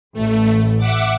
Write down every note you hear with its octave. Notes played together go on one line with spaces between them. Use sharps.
A1 A3
E5 F#5 D6